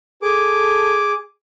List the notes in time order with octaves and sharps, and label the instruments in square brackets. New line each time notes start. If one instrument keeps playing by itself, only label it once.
[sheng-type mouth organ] G#4 D6 [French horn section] A4